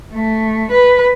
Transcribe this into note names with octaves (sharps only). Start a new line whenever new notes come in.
A3
B4